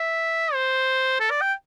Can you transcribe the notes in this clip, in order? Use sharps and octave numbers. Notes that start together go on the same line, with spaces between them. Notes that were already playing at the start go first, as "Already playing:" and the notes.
Already playing: E5
C5
A4
D5
G5